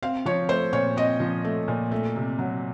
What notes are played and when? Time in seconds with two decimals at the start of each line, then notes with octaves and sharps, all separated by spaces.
0.02 C4 F5
0.25 F3 C#5
0.49 A3 C5
0.73 A#2 C#5
0.96 C4 D#5
1.20 F3
1.45 A3
1.68 A#2
1.91 A3
2.16 C3
2.39 F#3